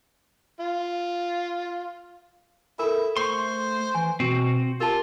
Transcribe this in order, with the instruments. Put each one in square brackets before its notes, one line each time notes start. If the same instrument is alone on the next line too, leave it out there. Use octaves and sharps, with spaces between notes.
[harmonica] F4
[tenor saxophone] E4 [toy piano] A4 A#4
[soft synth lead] A3 [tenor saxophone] C5 [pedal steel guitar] C6 C#6
[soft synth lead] E3 [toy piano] G#5
[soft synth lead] B2 [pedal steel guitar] C4 F#4
[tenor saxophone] F4 [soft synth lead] G4 [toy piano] A#4 A5